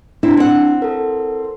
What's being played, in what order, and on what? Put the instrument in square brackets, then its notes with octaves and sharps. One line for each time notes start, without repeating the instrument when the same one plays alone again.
[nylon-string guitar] C4 E4 C5 [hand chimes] D4
[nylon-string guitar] C4 F#5
[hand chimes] A4 A#4